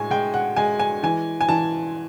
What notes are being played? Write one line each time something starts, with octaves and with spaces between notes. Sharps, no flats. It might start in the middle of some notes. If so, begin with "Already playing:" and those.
Already playing: A2 G#3 G#5
G#3 G5
F#5
G#3 G#5
G#5
E3 G#5
G#5
E3 A5